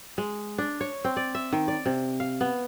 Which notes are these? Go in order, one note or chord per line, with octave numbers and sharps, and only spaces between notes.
G#3
D4
C#5
C4
D5
E5
D#3
D5
C3
F5
B3